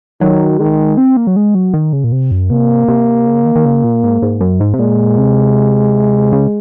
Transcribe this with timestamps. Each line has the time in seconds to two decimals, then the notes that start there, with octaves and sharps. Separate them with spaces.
0.21 D#3 F#3
0.59 D#3 G#3
0.97 C4
1.17 A#3
1.27 F#3
1.36 G#3
1.55 F#3
1.74 D#3
1.93 C#3
2.04 A#2
2.12 C3
2.31 F#2
2.51 C3 A#3
2.88 C3
3.27 C#3
3.45 D#3
3.56 D#3
3.65 C#3
3.84 A#2
4.03 G#2
4.22 G#2
4.41 F#2
4.60 G#2
4.74 C3
4.79 A#2 G#3
5.18 C3
6.33 C#3